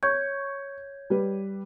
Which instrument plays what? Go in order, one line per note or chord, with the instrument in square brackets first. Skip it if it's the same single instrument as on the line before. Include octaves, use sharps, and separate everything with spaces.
[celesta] C#5 G6 G#6 [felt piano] C#6
[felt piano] G3 G4 B4